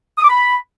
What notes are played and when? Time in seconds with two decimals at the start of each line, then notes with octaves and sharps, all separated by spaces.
0.18 D#6
0.24 D6
0.29 B5